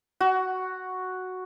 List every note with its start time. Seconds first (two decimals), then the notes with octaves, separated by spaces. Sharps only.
0.20 F#4